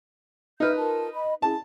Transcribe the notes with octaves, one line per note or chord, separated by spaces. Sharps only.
D#4 B4 E5 F6 G6
F4 A#4 A5
D#5 B5
C#4 E4 G#4 A5